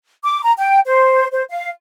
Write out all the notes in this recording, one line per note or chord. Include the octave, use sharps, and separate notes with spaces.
D6
A#5
G5
C5
C5
F5